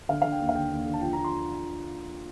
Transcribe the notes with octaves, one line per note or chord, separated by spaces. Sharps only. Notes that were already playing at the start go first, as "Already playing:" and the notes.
D3 F5
D3 F5
G5
D#2
F5
D3 G5
D#2
D3
A5
F3 G5
A#5
F3
C6